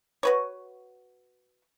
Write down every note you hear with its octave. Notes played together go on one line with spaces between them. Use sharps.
F#4 B4 C#5